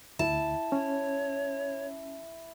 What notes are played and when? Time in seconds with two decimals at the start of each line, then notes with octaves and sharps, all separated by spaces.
0.19 D2 E4 A5
0.72 C#4 C#5